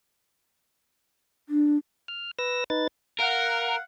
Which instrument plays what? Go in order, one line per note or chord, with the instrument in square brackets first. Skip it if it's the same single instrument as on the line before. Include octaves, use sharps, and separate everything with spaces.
[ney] D4
[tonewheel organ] F6
B4 E6 A#6
D#4 B4 A6
[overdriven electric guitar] A#4 [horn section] F5 F#5